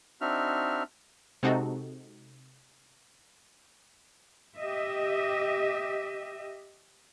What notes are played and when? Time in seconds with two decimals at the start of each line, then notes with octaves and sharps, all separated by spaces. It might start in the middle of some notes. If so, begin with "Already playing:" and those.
0.21 C4 D4 D#4 F#4 E5 F6
1.43 C3 G#3 C4 D#4 F#4 A4
4.57 G4 D#5 E5